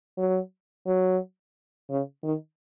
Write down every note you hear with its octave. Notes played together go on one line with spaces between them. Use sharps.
F#3
F#3
C#3
D#3